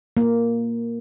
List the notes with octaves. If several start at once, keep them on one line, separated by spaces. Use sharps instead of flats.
A#3